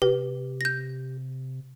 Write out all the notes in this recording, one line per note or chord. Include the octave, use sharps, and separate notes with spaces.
C3 G4 B4
G6 A#6